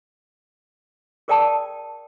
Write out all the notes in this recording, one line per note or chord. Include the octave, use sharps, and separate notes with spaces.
G#4 A#4 D5 G5 A5 D#6